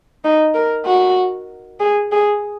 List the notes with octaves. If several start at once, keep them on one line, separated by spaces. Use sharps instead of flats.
D#4
A#4
F#4
G#4
G#4